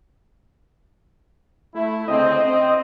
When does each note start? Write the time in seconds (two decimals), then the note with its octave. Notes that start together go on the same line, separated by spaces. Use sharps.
1.74 A3 E4
2.08 D2 C#3 C4 D#5
2.44 C4